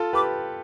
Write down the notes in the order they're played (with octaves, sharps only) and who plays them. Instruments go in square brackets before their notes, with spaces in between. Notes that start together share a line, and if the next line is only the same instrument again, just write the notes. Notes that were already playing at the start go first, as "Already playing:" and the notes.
Already playing: [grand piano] F4 A4
[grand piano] G4 B4 [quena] D6